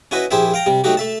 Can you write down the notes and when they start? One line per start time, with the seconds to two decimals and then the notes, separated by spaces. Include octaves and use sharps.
0.11 C#4 E4 F#4 B4 D#5
0.31 A#1 E4 G4 G#4 C5 E5
0.54 F5 G5 A#5
0.66 C3 G3
0.84 F#3 A3 D#4 F#4 G4
0.97 A3 E5 A5